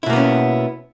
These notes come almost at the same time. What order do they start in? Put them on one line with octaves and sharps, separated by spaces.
E4 B2 A#3 B3 C#4